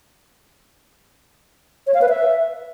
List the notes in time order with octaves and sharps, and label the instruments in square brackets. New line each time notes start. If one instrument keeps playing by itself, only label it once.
[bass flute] C#5
F5
B4
E5